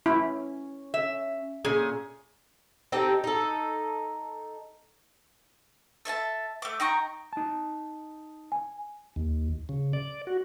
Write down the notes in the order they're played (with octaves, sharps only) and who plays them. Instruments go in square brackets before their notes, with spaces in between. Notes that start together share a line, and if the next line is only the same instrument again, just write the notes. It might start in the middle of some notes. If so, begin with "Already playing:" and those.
[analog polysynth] C#4 [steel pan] E4
[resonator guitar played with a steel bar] E5
A#2 C#4 G#4
[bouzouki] C4 D#4 G4 A4
D#4 A4
[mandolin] A4 E5 G#5 A5
A3 D6
D#4 G5 A#5 C#6
[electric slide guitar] D#4 A5
[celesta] G#5
[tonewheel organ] D#2
C#3
D5
F#4